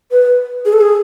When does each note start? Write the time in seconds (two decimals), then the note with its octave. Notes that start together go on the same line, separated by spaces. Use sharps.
0.12 B4
0.66 G#4
0.73 A4
0.81 G#4